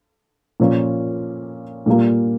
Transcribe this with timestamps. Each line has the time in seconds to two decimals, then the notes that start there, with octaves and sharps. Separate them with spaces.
0.60 A#2 F3 A#3 C#4 F4
1.86 A#2 G3 A#3 F4